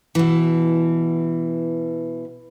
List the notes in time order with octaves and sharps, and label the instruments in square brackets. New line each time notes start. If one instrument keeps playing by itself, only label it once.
[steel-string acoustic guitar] B2 E3